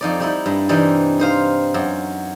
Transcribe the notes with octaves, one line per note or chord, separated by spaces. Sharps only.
F2 D#4 D5
G3 D#4 E4
G2
C3 E3 G3 D#4
D#4 C5 F5
F#2